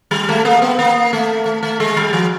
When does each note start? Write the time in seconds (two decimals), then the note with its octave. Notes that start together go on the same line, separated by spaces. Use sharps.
0.11 G3
0.29 A3
0.45 A#3
0.62 B3
0.79 A#3
1.13 A3
1.46 A3
1.63 A3
1.80 G#3
1.97 G3
2.13 F3